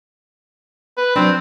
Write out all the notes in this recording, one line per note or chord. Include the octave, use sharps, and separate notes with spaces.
B4
F#3 C4 D4